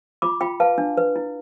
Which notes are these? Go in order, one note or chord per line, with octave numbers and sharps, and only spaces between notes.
F4 B5 D6
F4 G5 B5
B4 F5 A5
D4
B4
E4